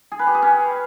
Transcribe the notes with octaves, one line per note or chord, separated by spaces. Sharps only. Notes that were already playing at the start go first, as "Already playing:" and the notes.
G#4
B4
G4
G#4
C#4